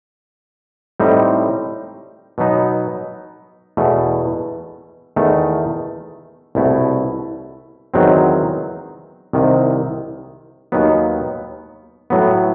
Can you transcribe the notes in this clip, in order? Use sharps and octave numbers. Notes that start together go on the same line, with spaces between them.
A2 G3 C4 D#4
B2 F#3 B3 D#4
E2 B2 A3
E2 D#3 A3
C2 B2 A3 E4
E2 D#3 F#3 C4
C2 C3 D#3
D#2 D#3 F#3 B3
A2 F#3 B3